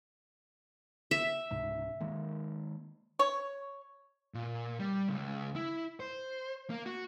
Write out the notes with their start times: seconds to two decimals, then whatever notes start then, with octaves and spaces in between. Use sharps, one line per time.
1.11 E5
1.51 C#2 G#2 C3
2.00 D#3 G#3 A#3
3.19 C#5
4.34 A#2
4.79 G3
5.09 C#2
5.56 E4
6.00 C5
6.70 A#3
6.86 F#4